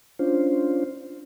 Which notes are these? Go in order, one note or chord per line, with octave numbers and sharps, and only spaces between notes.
C#4 D4 F4 C5